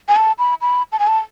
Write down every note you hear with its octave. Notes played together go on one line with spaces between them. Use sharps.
G#5
A5
B5
B5
A5
G#5
A5